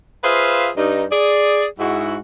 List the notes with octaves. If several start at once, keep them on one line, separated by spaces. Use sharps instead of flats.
F4 G#4 B4 C5 E5 F5
G2 D#4
G#4 D5
G#2 E4 F#4